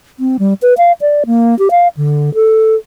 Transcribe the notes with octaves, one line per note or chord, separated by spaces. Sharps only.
C4
G3
B4
F5
D5
A#3
G4
F5
D3
A4